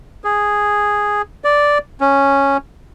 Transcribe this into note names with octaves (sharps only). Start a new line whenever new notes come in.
G#4
D5
C#4